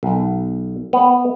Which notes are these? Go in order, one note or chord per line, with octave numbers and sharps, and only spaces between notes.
B1
B3